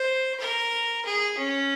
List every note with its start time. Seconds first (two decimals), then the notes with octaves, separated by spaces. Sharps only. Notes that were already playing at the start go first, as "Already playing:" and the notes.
Already playing: C5
0.40 A#4
1.05 G#4
1.38 C#4